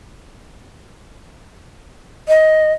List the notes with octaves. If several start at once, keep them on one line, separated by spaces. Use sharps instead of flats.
D#5